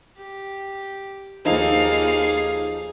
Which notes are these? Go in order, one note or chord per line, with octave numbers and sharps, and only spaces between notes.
G4
D#2 F3 D#4 G#4 A4 F5